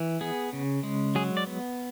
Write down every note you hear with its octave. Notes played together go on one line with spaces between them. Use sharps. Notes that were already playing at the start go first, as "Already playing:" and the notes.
Already playing: E3
B3 G#4
C#3
G#3
F#3 G#4
D5
B3